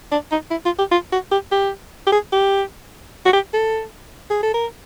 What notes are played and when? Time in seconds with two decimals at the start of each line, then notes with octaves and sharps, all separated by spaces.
0.12 D4
0.31 D#4
0.51 E4
0.65 F4
0.79 G4
0.91 F4
1.12 F#4
1.32 G4
1.52 G4
2.07 G4
2.12 G#4
2.32 G4
3.26 F#4
3.33 G4
3.53 A4
4.31 G#4
4.43 A4
4.54 A#4